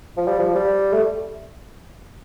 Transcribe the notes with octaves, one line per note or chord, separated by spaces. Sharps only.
F3
G3
F3
G3
A3